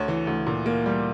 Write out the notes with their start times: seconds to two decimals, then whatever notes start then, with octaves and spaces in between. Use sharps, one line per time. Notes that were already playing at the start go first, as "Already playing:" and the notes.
Already playing: D2 C#5
0.08 E3
0.27 D2
0.47 A#2
0.66 A#3
0.86 G3